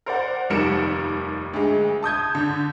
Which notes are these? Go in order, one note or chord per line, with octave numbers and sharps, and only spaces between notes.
A#4 C5 D5 F#5
F1 D#2 G3 A#4 C#7 E7
D2 G#3
A5 D#6 G6 G#6
D3